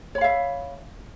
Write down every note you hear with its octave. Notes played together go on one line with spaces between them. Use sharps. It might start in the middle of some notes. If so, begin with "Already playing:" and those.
C#5 E5 F5 B5